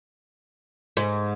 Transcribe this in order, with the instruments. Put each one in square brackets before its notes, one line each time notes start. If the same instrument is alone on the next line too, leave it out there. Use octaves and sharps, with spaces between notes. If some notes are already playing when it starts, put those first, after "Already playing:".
[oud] G#2